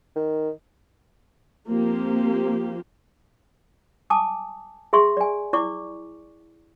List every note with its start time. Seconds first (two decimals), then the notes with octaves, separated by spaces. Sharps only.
0.15 D#3
1.70 F3 A#3 C4 G4
4.10 G#5 A5 D6 D#6
4.93 G#4 E5 C6 C#6
5.17 D5 G#5
5.53 E4 D5 C#6 D6